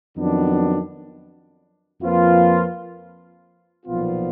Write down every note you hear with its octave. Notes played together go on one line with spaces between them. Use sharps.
F2 D#3 F#3 B3 D4
F2 F3 A#3 F4 B4
B1 A#2 F3 B3 F4